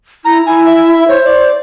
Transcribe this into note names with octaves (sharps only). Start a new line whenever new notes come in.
E4 A#5
E4 G#5
E5
C5 C#5
D5